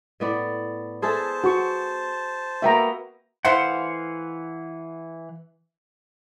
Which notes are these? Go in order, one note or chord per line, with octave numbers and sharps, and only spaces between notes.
A2 B3 D5
G#4 A4 C5 E5 A5
F#4 C#6
A#3 B3 F#4 E5 G5 A#5
E3 A3 E4 C5 F5 F#5